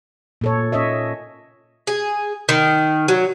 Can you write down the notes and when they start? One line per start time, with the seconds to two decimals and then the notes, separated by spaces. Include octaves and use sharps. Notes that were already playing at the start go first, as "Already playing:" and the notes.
0.41 A#2 A4 C#5
0.72 C#4 C#5 D#5 E5
1.87 G#4
2.49 D#3
3.08 F#3